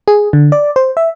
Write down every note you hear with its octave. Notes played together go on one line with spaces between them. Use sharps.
G#4
D3
D5
C5
E5